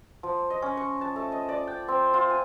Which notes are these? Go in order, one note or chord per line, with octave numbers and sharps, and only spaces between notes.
F3
D#5
C#4
C#6
A5
A3
D#5
D5
G5
C4
F4
G#5